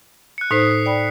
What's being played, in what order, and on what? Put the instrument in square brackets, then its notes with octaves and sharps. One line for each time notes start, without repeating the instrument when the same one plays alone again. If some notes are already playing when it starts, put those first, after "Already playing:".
[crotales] F#6 C#7
[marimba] A2 D#4 C5 [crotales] D#6 B6 C7
[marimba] D5 G5 B5